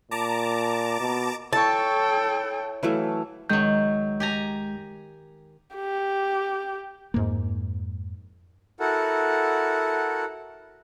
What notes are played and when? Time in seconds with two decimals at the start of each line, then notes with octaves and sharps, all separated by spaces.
0.11 A#2 A5 A#5 D6
1.00 B2
1.53 E4 A4 C#5 G5 A5 C#6
2.83 E3 F#3 A3 E4 F5
3.49 C#2 D#3 F#3 G#3 G6
4.20 G4 G#5 A#5
5.75 G4
7.14 F2 G#2 A#3
8.80 E4 F#4 A4 A#4 F#5